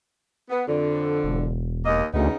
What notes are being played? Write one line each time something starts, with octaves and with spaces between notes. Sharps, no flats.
B3
F2 D3
E1
D#2 A#3 D#5
D2 C#3 B3 D#4